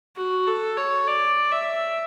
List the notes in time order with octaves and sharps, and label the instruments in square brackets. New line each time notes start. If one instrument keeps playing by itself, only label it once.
[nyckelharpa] F#4
A4
C#5
D5
E5